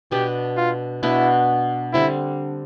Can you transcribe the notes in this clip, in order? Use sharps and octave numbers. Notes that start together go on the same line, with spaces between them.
B2 B3 D4 G4
F4
B2 B3 D4 E4
D3 G3 C4 E4